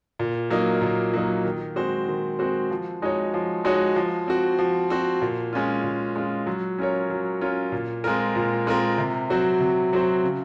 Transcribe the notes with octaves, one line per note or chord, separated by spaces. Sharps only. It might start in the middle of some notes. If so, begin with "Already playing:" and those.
A#2
F#3 A#3 D#4
A#2
F#3 A#3 D#4
D#3
G#3 C4 F#4 C5
D#3
G#3 C4 F#4 C5
F3
G#3 D#4 F#4 C#5
F3
G#3 D#4 F#4 C#5
F3
C4 F#4
F3
C4 F#4
A#2
G#3 C#4 F4
A#2
G#3 C#4 F4
F#3
C#4 F4 A#4 C#5
F#3
C#4 F4 A#4 C#5
A#2
G#3 C4 F4 A#4
A#2
G#3 C4 F4 A#4
C3
F#3 C4 F#4 C5
C3
F#3 C4 F#4 C5
C#3